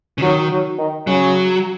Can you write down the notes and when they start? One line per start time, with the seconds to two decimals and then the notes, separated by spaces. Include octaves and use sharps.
0.18 C#3
0.22 D#3 F#3
0.50 F#3
0.78 D#3
1.07 C#3 F#3